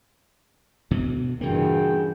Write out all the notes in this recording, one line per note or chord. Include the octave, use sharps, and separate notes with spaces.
D2 B2
G2 A#2 C#3 E3 A#3 F#4 G#4 G5